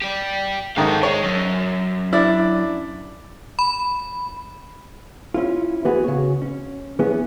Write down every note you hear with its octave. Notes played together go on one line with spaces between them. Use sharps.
G4 D5
G#2 D#3 D#4 A4 F5
G#3 C#5
F#2
D4 E4 D5
B5
C#4 E4 F4
E3 B3 F#4 G#4 B4
C#3 F#4 C#5
C#4
E3 B3 C#4 G#4